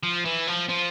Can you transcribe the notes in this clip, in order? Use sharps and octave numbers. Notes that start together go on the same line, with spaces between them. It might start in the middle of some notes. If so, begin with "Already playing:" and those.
F3
E3
F3
F3